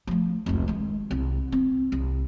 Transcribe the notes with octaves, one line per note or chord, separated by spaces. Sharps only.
F3 A3
F1 C#2
D#3 G#3
C2
C4
C2